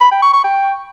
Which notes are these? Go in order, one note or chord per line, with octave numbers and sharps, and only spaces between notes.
B5
G5
C#6
C#6
G5